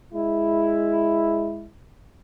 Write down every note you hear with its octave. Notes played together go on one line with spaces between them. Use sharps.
G#3 E4